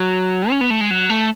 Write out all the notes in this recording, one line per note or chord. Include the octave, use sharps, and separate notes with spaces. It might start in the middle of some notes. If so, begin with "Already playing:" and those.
Already playing: F#3
C#4
B3
A3
G#3
F#3
A3